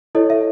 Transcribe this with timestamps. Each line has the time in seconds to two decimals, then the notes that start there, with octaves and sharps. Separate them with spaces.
0.15 E4 A4 C#5 D#5
0.30 E5